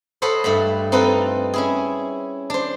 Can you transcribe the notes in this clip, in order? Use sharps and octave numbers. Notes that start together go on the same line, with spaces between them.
A4 C5 C#5 D#5 F#5 B5
G2 A3 F#5 B5
C4 D#4 F4 A4 B4
C#4 E4 G#4
D4 C5